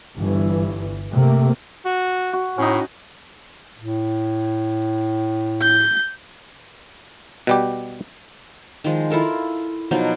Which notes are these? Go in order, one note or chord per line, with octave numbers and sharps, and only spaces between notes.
G1 G2 E3
C3 A3 A#3
F#4
F#4
A2 C#4 D#4
A2
G6
B2 G3 G4
D#3 F3 G#3
E4 F4 A4 A#4
B2 F3 F#3 D#4